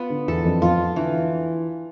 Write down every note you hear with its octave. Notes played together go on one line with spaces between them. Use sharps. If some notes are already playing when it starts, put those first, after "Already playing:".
Already playing: B3 F4
D3
E2 E3 A4
F2 F3
F2 F3 F4
D3 E3